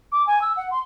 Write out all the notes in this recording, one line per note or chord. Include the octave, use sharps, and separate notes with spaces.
D6
G#5
E6
F#5
C6